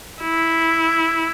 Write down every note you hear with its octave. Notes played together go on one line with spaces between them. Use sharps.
E4